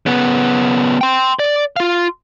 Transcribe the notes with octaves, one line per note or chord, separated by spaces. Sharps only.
C#3 B3
G5 C6
D5
F4 F5